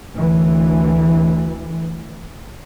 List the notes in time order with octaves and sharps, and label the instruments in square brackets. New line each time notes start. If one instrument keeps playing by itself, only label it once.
[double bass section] D2 E3